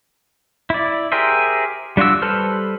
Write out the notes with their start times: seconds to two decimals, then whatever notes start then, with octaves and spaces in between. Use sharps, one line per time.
0.70 E4 D5
1.12 G4 G#4 A#4 C5 E5
1.97 G3 D4 F4 F#4 E6
2.22 G3 A4 B4 C5 F6